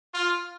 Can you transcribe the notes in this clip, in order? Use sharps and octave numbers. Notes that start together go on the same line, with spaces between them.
F4